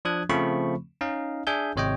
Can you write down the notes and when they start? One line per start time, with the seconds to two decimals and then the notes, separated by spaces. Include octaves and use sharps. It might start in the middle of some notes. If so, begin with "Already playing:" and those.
0.05 F3 D4 D#6 F#6 G#6
0.29 C#3 F3 A3 C4 B5 C#6
1.01 C#4 D#4 D#5 F5
1.47 D4 G#4 E5 G#5 G6
1.76 G#1 C3 C#5 D#5 G5